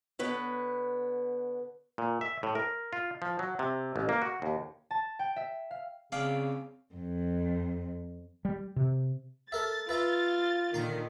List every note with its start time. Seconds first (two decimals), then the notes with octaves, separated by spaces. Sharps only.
0.19 D3 B3 B4 C#5
1.98 A#2
2.21 E5
2.43 A2
2.55 A#4
2.93 F4
3.22 F3
3.39 F#3
3.59 C3
3.96 A1
4.09 A#3
4.22 F#4
4.42 D#2
4.91 A5
5.19 G5
5.36 E5
5.71 F5
6.12 C#3 C4 C#4 D5 F5 G5
6.94 F2
8.45 G3
8.76 C3
9.52 A4 A#4 E5 A6
9.89 F4 B4 E5 A#5
10.74 A#2 D3 D#3 A#5 C6